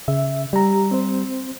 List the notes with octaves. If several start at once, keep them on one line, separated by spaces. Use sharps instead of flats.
C#3 E5
G3 G4 A#5
C4 C5